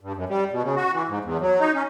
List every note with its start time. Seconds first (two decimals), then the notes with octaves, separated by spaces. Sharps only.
0.01 G2
0.16 F#2
0.29 G3
0.51 B2
0.63 C#3
0.76 F#4
0.93 E3
1.09 G#2
1.24 E2
1.41 F#3
1.60 D#4
1.75 C#4